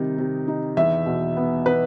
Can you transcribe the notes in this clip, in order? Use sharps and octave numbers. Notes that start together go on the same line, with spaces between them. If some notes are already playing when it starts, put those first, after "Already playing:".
Already playing: C3 D#3 G3 D#4
C3
D#4
E2 E5
B2
B3
B3 B4